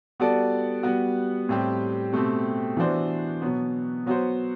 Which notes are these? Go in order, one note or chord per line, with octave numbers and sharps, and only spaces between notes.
G3 B3 F#4 A4 D5
G3 B3 F#4
A2 G3 C4 G4
B2 A3 C4 G4
E3 B3 D4 F#4 C5
B2 F#3 B3
F#3 B3 F#4 C5